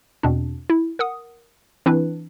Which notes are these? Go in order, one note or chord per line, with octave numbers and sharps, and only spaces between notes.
E2 B2 C4 D4
E4
A#4 F#5 D#6
E3 C4 D4 E4 B4